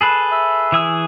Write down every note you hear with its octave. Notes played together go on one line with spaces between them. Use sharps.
G#4 A4 B4
E5
E3 G#4 E6